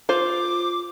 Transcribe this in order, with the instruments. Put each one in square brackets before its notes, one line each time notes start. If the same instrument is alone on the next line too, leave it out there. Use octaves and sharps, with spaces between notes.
[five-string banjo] F4 C5 [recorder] D6